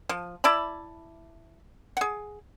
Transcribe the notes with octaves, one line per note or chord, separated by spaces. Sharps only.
F3
E4 D5 A5 B5
G#4 F#5